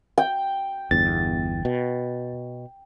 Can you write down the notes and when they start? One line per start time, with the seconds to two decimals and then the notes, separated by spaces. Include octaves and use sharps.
0.18 G5
0.91 G1 E2 A6
1.65 B2